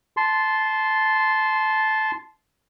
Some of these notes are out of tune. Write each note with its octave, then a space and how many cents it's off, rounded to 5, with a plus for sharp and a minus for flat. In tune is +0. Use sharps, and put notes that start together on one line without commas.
A5 -15 C6 -5